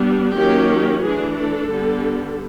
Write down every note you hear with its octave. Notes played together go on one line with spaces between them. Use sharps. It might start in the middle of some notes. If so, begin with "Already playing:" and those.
Already playing: G3 B3 D4
D#3 F#3 A#3 C#4 G4
E3 A3 D4 G#4
A4
D3 G3 B3